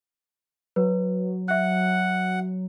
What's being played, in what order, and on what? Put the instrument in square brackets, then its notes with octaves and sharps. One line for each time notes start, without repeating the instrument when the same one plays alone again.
[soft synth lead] F#3 [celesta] B4
[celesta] E5 F#6 [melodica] F#5